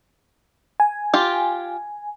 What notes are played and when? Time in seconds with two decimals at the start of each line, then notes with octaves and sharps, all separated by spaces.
0.80 G#5
1.14 F4 G4